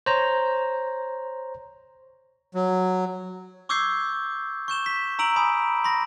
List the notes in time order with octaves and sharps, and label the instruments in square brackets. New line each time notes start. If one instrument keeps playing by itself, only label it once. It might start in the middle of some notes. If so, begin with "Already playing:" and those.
[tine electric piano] C5 C#5 A#5
[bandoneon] F#3
[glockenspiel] C#6 D6 E6 G6 G#6 C7
C#6 G6 E7 G7
B6
A#5 E6 D7 F#7
G#5 B5 D#6
B5 C6 A#6